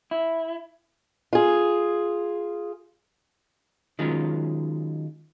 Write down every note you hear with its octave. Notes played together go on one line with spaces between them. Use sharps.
E4
F4 G#4
D#3 F#3 G#3 C#4 F4